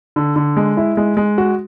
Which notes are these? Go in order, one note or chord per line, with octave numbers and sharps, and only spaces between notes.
D3
D3
G#3
E4
G#3
G#3
F#4